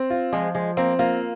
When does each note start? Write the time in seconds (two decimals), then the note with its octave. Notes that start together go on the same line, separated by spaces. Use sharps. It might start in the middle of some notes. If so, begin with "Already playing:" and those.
Already playing: C4
0.10 F4
0.32 F3 G#3
0.55 F3 G#3
0.77 A#3 C4
0.99 A#3 F4